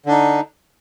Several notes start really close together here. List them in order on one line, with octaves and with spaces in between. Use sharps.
D3 D4 D#4